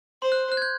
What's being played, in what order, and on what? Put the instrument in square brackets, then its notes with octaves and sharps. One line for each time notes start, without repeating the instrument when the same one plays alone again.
[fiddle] C5 [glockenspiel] C6
[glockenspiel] F#6
F#6
G#6
G6